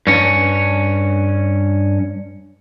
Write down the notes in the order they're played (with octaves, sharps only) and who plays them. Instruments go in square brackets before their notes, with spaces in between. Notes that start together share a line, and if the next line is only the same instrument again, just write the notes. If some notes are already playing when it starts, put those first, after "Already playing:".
[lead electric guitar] G2 C#4